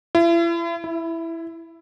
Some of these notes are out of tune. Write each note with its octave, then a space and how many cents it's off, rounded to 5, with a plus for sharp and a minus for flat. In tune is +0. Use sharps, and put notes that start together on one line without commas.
E4 +40
E4 +5